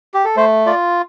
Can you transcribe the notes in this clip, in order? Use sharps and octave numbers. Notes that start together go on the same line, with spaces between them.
G4
A4
A3 C5
F4 D5